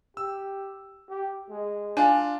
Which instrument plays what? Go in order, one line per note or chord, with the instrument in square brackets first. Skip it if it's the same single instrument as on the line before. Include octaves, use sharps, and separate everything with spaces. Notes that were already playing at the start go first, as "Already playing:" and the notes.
[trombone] G4 [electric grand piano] E6
[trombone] G4
G#3
[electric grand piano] D4 F4 [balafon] G#5